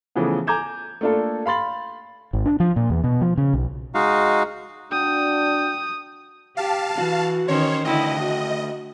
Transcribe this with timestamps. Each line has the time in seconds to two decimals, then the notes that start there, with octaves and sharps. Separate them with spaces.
0.15 C#3 E3 F3 A3 B3
0.47 G#5 A#5 D6 G6 G#6 E7
1.01 A3 A#3 D4 F4 A4
1.46 F5 B5 C6 A6 F#7
2.33 G#1
2.46 D4
2.60 F3
2.76 A#2
2.90 E2
3.04 B2
3.21 F3
3.38 C#3
3.54 B1
3.95 G#3 D#4 F#4 F5
4.92 D4 F#4 G5 D#6
6.57 G4 F5 A5
6.98 E3 F#4
7.48 D#3 C#4 C5 C#5
7.85 D2 D3 E4 D#5 G5
8.20 F#4